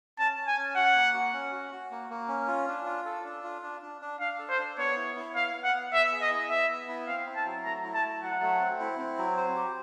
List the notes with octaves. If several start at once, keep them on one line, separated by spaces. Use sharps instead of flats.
C#4 A5
C#4
G#5
C#4
F#4 F#5
A#3
F#4
C#4
F#4
F#4
A#3
A#3
C#4
F4
D4
F4
A4
D4
F4
D4
D4
D4
D4 F5
A4
C5
D4
B3 C#5
E4
E4
B3 F5
B3
F#5
B3
B3 E5
G#4
D#5
E4
B3 E5
B3
E4
C4 F5
E4
A5
F#3
A3 A#5
E4
A5
A3
F#3 F#5
A3
C4
E4
C4
F#3
C5
G4